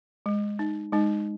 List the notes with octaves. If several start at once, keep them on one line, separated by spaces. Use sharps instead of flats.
G#3
D#4
G#3 D#4